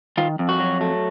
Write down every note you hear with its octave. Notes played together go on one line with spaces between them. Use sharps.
D#3 F4
F2
F#4
F#3
A3